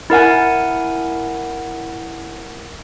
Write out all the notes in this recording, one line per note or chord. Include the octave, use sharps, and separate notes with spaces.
E4 A#4 F#5 G#5